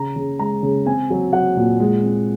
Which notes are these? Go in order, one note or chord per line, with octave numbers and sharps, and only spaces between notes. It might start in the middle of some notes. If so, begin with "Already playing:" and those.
Already playing: C#3 A#5
C#3
G#3 A#5
C#3
C4 G#5
F#3
F#3 F#5
A#2
G#3
C4